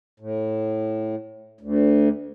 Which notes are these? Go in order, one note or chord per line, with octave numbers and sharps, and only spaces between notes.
A2
D2